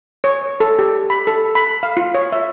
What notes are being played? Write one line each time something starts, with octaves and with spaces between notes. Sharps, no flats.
C#5
A4
G4
B5
A4
B5
F5
F4
C#5
E5